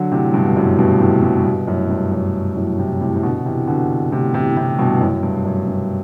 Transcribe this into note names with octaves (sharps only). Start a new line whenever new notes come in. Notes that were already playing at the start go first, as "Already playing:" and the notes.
Already playing: D3 F#3
A2 C3
G2 B2
F#2 A2
G2 B2
A2 C3
G2 B2
G2 B2
F#2 A2
G2
F#2
F#2 A2
A2 C3
A2 C3
C3
B2 D3
C3 E3
B2 D3
A2 C3
C3 E3
A2 C3
G2 B2
F#2 A2
G2
F#2
G2